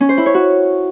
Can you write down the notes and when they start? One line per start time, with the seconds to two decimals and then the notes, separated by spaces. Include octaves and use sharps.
0.01 C#4
0.09 C5
0.17 E4
0.26 C#5
0.34 F#4